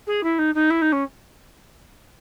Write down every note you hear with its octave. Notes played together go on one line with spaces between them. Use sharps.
G#4
E4
D#4
D#4
E4
D#4
C#4